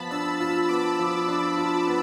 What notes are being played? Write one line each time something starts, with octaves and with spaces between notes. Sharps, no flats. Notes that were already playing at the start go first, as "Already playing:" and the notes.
Already playing: F3 B3 F4 A5 B5
D4 E6
F4 E6
B3 D6
F3
D4
F4
B3